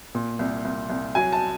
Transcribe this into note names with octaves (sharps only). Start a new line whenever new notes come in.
A#2
C2
C2
C2
F#3 G#5
A5